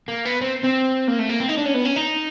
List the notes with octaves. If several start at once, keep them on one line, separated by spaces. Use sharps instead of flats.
A#3
B3
C4
C4
A#3
A3
A#3
C4
D#4
D4
C#4
B3
C#4
D#4